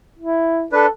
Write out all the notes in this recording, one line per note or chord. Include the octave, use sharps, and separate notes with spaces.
E4
D4 A4 B4